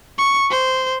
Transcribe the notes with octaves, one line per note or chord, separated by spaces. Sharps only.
C#6
C5